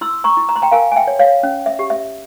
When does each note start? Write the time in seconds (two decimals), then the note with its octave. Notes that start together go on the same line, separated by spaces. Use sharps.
0.01 E4 C6 E6
0.24 A#5 C#6
0.37 E4
0.49 A#5
0.56 C6
0.62 G5 A#5
0.71 A#4 F5 G#5
0.91 G#5
0.96 E5 G5
1.07 C#5
1.19 C#5 F5
1.43 C#4
1.66 E5
1.79 G4
1.90 E5